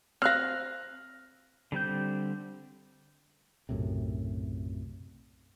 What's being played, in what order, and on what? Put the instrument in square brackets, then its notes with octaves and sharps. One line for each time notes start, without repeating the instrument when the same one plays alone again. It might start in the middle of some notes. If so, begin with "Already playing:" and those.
[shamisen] C4 F5 [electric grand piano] F6 F#6 A#6
[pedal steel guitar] D3 G3 C4 G6
[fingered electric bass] B1 F#2 A2 C3